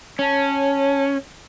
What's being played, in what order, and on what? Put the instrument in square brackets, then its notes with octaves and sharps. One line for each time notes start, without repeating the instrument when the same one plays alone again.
[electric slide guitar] C#4 [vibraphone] C#5 A5